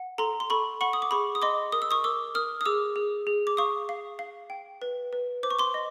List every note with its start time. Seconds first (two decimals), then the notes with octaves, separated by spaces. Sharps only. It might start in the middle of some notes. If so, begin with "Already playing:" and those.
Already playing: F#5
0.18 A4 A#5 C6
0.40 C6
0.50 A4 B5 C#6
0.81 F#5 B5 C#6
0.93 D#6
1.02 D6
1.11 G#4 B5 C#6
1.35 D#6
1.42 D#5 C6 D6
1.72 A#4 D#6
1.82 E6
1.91 C#6 D#6
2.04 A#4 D6 E6
2.35 A#4 D#6 F6
2.61 D#6
2.65 G#4 D6 E6
2.96 G#4
3.27 G#4
3.47 D6
3.57 F5 C#6 D#6
3.89 F5
4.19 F5
4.50 G5
4.82 B4
5.13 B4
5.43 C5 D6
5.51 C#6
5.59 C6 D6
5.74 D#5